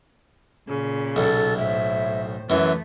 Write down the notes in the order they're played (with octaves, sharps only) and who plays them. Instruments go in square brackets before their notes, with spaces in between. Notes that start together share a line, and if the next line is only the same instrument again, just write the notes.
[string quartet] A#2 C#3
[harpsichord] B1 [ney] A4
[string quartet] A2 C5 [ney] E5
[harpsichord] F#2 E3 [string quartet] A3 [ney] B4